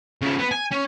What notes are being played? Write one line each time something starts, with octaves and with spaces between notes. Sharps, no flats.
C#3 F3
B3
G#5
C#4